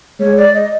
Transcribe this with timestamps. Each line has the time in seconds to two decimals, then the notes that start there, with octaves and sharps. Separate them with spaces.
0.19 G#3 C#5
0.37 D5
0.55 D#5